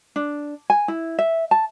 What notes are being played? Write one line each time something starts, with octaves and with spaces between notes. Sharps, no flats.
D4
G#5
E4
E5
A5